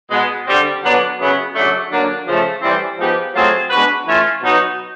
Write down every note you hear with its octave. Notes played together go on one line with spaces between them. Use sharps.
B2 G#3 B3
D3 G3 C4
D3 F#3 B3 D4
F#2 C#3 F#3 B3
F#2 C#3 F#3 A3 D4
D3 F#3 A#3 D4
C#3 F3 A3
A2 E3 G3 C4
F3 G#3 B3 D#4 G4
F#3 A3 C4 F4 G#4
G#3 B3 D4 F#4 B4
E3 A3 C#4 F4
B2 F#3 B3 D#4 F#4